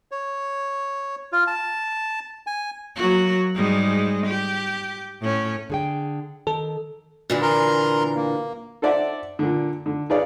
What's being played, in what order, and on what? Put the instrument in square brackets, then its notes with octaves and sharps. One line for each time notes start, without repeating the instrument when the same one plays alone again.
[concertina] C#5
F4
A5
G#5
[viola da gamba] F#3 A#3 F#4
G#2 G3 G#3
G4
A2 C#4
[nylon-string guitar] D3 G#4 G5
[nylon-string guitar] D#3 [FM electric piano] A4
[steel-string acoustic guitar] A#2 D3 E3
[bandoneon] A#4 A#5 C6
A#3
[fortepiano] A4 C5 D5 E5 F#5
A#2 D3
D3
G#4 B4 C#5 D5 F5